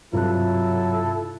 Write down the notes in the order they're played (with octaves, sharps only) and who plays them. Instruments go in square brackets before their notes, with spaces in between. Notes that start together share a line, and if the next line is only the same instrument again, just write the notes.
[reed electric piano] G2 C3 [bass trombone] F#3 [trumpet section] E4 A4 [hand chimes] F4 F#6